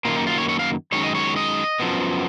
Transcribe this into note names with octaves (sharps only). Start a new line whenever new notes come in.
F#2 D#3 A#3 F4
D#4
F4
C#5
C#5
F5
F#2 D#3 G#3 C#5
D#5
C#5
D#5
F#2 F3 B3